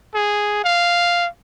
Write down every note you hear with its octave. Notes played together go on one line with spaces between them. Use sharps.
G#4
F5